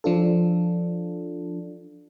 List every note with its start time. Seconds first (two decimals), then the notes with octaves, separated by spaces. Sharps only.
0.04 F3 D4 F4 A4